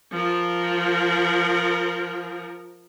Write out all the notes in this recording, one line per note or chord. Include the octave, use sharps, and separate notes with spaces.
F3 A#4